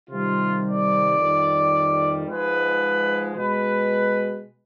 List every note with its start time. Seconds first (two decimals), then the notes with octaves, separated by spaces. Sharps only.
0.10 C3 D#3 G3 F4
0.64 D5
1.18 F2 D#3 G3
2.26 G#2 F3 G#3 B4
3.35 B2 G#3 B4